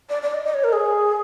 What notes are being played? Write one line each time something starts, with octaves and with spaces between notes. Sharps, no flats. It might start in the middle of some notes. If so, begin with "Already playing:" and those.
D5
D5
D#5
D#5
C#5
A#4
G#4